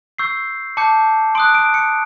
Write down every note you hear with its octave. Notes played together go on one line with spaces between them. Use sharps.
C#6 E6 G6 C7
A5 D6 G6 C#7
C6 D#6 F#6 D7
D7
C#7